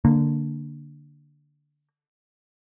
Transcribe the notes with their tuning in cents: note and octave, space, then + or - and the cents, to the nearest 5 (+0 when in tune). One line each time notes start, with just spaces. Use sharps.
D3 +0 A#3 -15